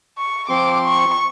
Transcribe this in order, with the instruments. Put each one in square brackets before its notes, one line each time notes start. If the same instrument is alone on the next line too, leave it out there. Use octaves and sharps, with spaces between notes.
[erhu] C#6
[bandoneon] F3 C4 C6 [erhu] D6
[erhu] C#6